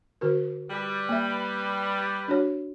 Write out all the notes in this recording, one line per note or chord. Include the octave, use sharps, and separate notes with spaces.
D3 F#4 A#4
G3 B4
A#3 E5
D4 F#4 C#5